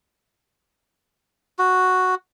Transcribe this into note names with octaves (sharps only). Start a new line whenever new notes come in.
F#4